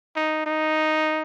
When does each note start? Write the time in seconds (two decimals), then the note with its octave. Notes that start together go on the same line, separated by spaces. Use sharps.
0.16 D#4
0.46 D#4